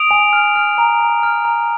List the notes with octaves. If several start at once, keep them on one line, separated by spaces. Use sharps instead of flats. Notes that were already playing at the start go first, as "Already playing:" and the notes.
Already playing: D#6 D7 F7
G#5
F6
F6
A#5
A#5
F6
A#5